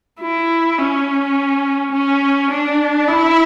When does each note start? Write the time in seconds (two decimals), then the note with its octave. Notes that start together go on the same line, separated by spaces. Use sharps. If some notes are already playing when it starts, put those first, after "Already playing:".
0.21 E4
0.78 C#4
1.93 C#4
2.51 D4
3.08 E4